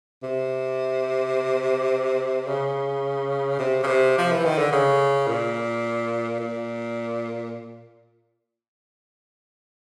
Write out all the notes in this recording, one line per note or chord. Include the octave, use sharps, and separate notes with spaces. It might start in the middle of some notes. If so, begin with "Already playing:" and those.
C3
C#3
C3
C#3
C3
F3
E3
D#3
D3
C#3
A#2
A#2